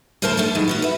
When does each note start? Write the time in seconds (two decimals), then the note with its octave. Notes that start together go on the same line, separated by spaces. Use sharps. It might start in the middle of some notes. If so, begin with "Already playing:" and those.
0.22 D2 F3 A#4 C5 E5 A5
0.37 G3 A3 B3 D4
0.55 D#3 E3 F#3 G#3
0.68 B3 C#4 F#4
0.82 B4 E5